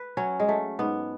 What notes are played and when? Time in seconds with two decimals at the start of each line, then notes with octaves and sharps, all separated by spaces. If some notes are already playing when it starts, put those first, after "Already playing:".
Already playing: B4
0.17 F#3 C#4
0.40 G#3
0.48 F#3 A3
0.79 G#2 B3